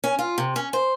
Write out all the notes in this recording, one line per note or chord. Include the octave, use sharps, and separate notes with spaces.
C#4
F4
C3
C#4
C5